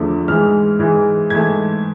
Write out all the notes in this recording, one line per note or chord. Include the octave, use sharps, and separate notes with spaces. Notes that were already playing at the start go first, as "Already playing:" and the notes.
Already playing: E2 D3 F3 A3
G#2 E3 G#3 F6
G#2 E3 G#3
G#2 E3 A3 G#6